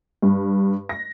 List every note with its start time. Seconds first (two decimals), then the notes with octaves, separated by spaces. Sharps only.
0.22 G2
0.89 A#6